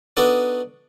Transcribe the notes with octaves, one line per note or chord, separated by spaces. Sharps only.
B3 D4 D#4 F#4 A4 D5